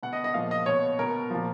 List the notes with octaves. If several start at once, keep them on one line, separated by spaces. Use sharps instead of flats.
B2 F#5
D#5
D#5
A#2 F3 F5
D#5
B2 C#5
B2 A#4
A#2 F3